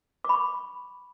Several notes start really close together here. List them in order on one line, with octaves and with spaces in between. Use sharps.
D6 B5 C#6